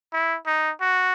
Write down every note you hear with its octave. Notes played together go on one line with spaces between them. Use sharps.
E4
D#4
F#4